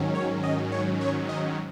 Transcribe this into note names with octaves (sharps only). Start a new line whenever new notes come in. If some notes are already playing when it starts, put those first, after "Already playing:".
Already playing: G#2 D#3 F#3 C#4
C#5
D#5
C#5
C#5
D#5